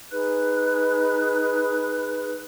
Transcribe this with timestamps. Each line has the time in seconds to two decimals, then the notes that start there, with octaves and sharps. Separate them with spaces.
0.11 D#4 G#4 B4 F#6